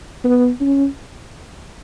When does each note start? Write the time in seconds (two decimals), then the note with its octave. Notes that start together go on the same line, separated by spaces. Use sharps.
0.24 B3
0.61 C#4